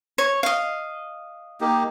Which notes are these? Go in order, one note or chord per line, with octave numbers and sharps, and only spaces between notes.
C#5
D#5 F5
A#3 D#4 G4